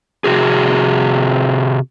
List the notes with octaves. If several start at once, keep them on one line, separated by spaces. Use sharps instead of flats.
C3 F#4 G#4